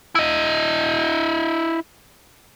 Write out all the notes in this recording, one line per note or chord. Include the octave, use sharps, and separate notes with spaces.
E4 D#5